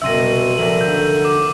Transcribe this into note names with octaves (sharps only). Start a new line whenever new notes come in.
F#1 C2 B2 E5 C6 E6 A#6 D#7
D#1 A#1 A4 A#4 D5 E5 F#7
D3 F#4 A#4 G6
D6